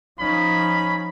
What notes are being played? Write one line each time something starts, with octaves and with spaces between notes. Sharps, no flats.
F3 C#4 D#4 B5